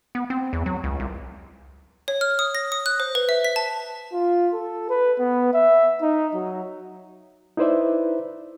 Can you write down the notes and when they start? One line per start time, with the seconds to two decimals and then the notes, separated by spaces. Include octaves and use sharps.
0.15 B3
0.30 C4
0.53 E2
0.66 F#3
0.84 C#2
1.00 C2
2.08 C#5
2.21 F6
2.39 D#6
2.55 A#6
2.72 D#6
2.86 F#6
3.00 C5
3.15 B4
3.29 E5
3.44 B6
3.56 A5
4.13 F4
4.53 A4
4.90 B4
5.19 B3
5.54 E5
6.02 D#4
6.34 F#3
7.57 D#4 E4 B4 C5 D5 E5